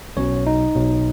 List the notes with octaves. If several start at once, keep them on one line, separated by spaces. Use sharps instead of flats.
B1 B2 F#3 C#4 C#5
D#4
B1 B2 F#3